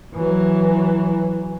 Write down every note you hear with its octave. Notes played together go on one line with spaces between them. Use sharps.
E3 F#3